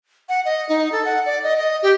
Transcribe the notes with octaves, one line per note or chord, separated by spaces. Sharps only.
F#5
D#5
D#4
A4
F#5
D5
D#5
D#5
G4